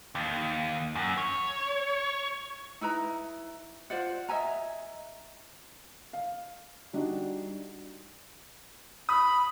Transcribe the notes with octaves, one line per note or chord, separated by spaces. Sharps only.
D#2
F#2
C#5
D#4 E4 B4 A#5
F4 C5 D5 F#5
D#5 E5 G#5 A#5
F5
G3 D4 D#4 F#4
B5 D#6